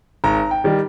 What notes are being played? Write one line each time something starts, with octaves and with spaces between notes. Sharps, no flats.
G#1 A#5
G5
D#3 G3